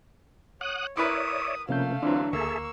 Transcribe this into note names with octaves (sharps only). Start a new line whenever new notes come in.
C#5 F#5 D#6 F#6
E4 A#4 B4 C#5 D5 E5 D#6
C3 F3 A3 A#3 C#4 F5 G6
D3 E3 F#3 C4 D4 F4
D2 A#3 G#4 A4 E5 C#6 E6